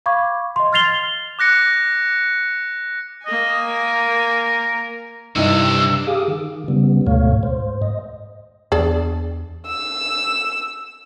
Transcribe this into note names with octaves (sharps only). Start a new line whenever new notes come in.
F5 B5 C#6 D6 G#6
D#5 C6
F6 G#6 A6 C7 F7 G7
D6 F#6 A#6 C#7
A#3 D#5 G#5
A#4
C2 G2 C3 D#4 E4 D#5 E6
G4 G#4 F5 D6 D#6
D#3
C#3 G3 B3
D2 G#2 B2 A3 C#5 F5
G#2 C5
D#5
E2 B3 D4 G#4 D5 A5
E6